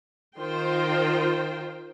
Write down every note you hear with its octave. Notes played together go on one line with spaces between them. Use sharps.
D#3 F4 C5 G5 C6